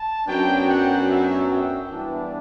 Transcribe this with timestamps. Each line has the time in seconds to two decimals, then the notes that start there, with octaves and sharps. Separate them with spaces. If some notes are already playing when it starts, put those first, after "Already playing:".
Already playing: A5
0.27 F#2 F#3 B3 D4 G5
0.68 F#5
1.09 E5
1.49 G5
1.89 G2 E3 B3 D4